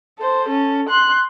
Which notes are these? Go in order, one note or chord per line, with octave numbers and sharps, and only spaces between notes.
A4 C5
C#4 A4
C6 F#6